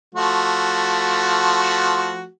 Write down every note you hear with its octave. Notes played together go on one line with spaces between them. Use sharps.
F3 A3 F#4